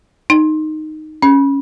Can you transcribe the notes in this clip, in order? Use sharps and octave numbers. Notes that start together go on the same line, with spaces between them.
D#4
C#4